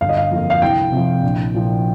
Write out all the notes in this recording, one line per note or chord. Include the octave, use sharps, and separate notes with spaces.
G1 F5
D#5
F5
F2 F3 A#3
F5
C2 G5
C3 F3
A#1
A#2 F3